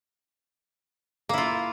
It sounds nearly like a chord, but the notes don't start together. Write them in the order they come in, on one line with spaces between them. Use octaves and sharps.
A#3 E4 F4